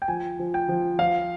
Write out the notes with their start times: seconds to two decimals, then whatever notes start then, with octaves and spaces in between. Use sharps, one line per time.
0.02 G5
0.08 F3 G#5
0.39 F3
0.54 G5
0.69 F3
0.99 F3 F5